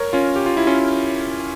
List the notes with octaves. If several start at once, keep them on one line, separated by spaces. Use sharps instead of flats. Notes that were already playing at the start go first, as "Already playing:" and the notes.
Already playing: A#4 C#5
C#4 F4
G4
F4
E4
C#4 F4